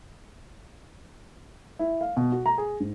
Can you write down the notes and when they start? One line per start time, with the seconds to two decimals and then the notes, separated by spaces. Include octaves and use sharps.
1.79 E4
2.01 F5
2.17 B2
2.32 F#4
2.46 A#5
2.58 G#4
2.80 G#2